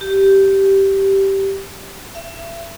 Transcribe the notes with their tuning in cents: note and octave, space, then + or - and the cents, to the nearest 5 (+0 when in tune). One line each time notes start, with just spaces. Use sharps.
G4 -10
E5 +35